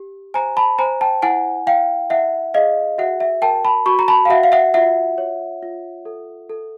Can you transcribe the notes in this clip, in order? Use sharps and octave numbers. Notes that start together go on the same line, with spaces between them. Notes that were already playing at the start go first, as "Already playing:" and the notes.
Already playing: G4
C5 G#5 A#5
A5 B5
C5 G#5 A#5
G5 A5
E4 F#5 G#5
E4 F5 G5
E4 E5 F#5
G#4 D#5 F5
F#4 E5 F#5
E5
A#4 G5 A5
A5 B5
F#4 B5 C#6
A#5
A5 B5
F5
F#4 E5 F#5
F5
E5 F#5
F4 E5 F#5
C#5
F4
A4
A4